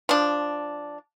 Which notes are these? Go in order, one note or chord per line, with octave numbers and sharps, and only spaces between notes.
F3 D4